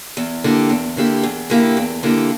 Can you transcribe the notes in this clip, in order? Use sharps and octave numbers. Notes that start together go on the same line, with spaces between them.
E2
D3 A#3 E4 G4
E2
D3 A#3 E4 G4
E2
D3 A#3 E4 G4
E2
D3 A#3 E4 G4